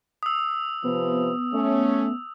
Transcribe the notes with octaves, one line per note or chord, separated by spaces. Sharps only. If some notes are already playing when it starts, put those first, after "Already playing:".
D#6 E6
C3 F3 B3 B4
A3 C#4